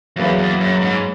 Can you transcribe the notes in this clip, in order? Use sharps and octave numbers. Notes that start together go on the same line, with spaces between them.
E2 F#3 A#3 C#4 G#4 B4
E2
F#2
G#2